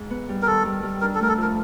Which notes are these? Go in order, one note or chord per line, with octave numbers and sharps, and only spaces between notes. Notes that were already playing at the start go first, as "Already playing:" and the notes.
Already playing: G#2
B3
G3
A#4
D#3 A4
G3
G3
D4 A#4
A4
A3 A#4
A4
F3 A#4